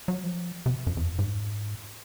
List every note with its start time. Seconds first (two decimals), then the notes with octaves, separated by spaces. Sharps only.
0.08 F#3
0.24 F3
0.66 C3
0.87 F#2
0.97 F2
1.08 F#2
1.19 G#2